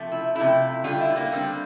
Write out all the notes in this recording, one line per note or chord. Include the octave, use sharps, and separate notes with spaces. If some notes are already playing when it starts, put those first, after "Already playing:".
Already playing: C3 F3 A3
E4
C3 F3 A3 E4
D3 G3 F4
E4
A#3
D3 G3 C4